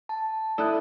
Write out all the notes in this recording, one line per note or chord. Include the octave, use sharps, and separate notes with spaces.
A5
E4 A4 D5 D#6 F#6